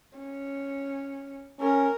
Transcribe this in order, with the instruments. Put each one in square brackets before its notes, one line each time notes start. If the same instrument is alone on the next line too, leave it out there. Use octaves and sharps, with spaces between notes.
[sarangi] C#4
[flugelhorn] C#4 [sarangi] A#4